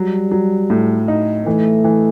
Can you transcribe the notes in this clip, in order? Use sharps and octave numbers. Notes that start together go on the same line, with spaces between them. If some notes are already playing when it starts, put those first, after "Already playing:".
Already playing: F#3 G3
F#3
A2
D#4
E3 A3
E3